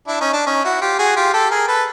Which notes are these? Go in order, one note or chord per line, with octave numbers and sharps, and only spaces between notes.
D4 E4
C#4 D#4
D4
C#4 D#4
E4 F#4
F4 G4
F#4 G#4
F4 G4
G4 A4
G#4 A#4
A4 B4